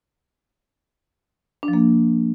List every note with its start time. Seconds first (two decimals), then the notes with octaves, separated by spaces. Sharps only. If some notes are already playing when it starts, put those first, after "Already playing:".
1.63 D4
1.68 F3
1.73 A#3